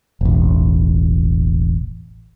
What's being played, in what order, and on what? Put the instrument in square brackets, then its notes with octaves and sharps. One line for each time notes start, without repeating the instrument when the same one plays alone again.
[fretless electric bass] E1 A1